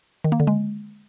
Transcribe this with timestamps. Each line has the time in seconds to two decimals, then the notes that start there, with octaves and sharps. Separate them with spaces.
0.24 D#3
0.32 A#3
0.40 D3
0.47 G#3